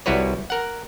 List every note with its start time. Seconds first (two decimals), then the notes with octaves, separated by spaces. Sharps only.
0.06 C2 G3 E4 F#4 B4 C#5
0.50 A#4 F#5